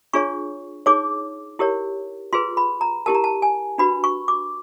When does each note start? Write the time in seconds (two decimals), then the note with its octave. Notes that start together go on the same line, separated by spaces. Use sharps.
0.13 D4 F4 G#4 C#5 C#6
0.86 D#4 G#4 C#5 D6
1.59 E4 G4 A#4 C#5
2.33 F4 G#4 B4 C6
2.57 B5
2.81 A#5
3.06 E4 G4 A#4 A5
3.15 A#5
3.24 A5
3.42 G#5
3.78 D4 F#4 B4 B5
4.04 C#6
4.28 D6